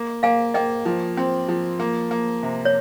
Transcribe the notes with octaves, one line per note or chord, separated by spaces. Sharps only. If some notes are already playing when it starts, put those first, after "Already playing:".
Already playing: A#3
A#3 F5 G#5
A#3 D#5 G5
F3
C4
F3
A#3
A#3
C3
C#5